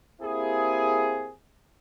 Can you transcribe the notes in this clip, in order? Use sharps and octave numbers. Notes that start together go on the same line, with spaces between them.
A#3 C4 E4 G4 G#4